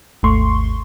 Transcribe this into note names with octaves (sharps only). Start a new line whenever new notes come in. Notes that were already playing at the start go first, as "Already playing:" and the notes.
G#1 D#2 A3 C6 C#6